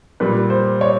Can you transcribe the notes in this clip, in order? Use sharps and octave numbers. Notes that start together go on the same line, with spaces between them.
A#2 G3 A#3 B4
C5
C#5